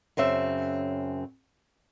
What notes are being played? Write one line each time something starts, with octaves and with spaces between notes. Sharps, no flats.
F#2 C#3 C4 E5